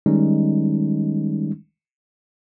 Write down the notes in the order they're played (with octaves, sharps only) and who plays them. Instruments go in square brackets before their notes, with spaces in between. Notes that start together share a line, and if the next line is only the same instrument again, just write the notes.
[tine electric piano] D#3 G3 G#3 C#4 D#4